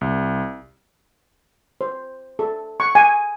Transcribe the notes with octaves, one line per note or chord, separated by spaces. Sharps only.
C2
C5
A4
C#6
G#5